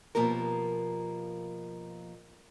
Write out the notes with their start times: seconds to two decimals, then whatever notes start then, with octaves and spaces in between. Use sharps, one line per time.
0.15 B2 F3 A#3 G4 A#4